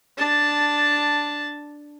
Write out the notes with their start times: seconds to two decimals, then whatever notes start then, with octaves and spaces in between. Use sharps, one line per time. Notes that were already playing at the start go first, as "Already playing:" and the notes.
0.18 D4 A5